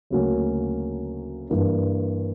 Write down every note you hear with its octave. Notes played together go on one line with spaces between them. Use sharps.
D2 C#3 F#3 A#3 C#4
G2 E3 A#3 D4